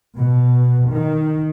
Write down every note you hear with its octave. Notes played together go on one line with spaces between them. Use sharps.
B2
D#3